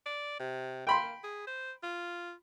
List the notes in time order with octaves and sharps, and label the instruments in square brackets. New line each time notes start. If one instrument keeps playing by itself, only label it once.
[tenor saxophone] D5
C3
[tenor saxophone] A#3 [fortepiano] G5 B5 C6
[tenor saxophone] G#4
C5
F4